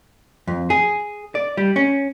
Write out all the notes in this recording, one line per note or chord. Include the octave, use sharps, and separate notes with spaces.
F2
G#4
D5
G3
C#4